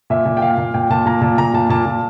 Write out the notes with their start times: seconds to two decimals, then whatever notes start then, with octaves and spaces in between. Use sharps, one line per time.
0.10 A#2 E5
0.25 A#2
0.37 G5
0.42 A#2 F5
0.57 A#2
0.74 A#2 G5
0.90 A#2 A5
1.06 A#2 A#5
1.21 A#2 A5
1.38 A#2 A#5
1.53 A#2 A5
1.69 A#2 A5
1.86 A#2